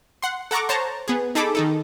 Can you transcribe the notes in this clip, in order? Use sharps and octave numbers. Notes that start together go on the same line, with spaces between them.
F#5 C6
A4 F#5 A#5 C#6 D6
C5 C#5 A5 A#5
B3 G#4
D#4 G#4 A4 B5 D6
D#3 D#4 A4